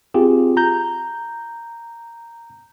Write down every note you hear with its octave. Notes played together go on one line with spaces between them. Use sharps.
C4 F4 G4 G#4
A#5 G6